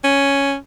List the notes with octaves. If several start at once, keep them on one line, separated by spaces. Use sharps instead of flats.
C#4